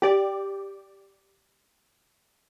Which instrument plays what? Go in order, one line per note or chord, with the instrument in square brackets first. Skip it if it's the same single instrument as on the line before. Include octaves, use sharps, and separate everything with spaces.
[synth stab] G4 D5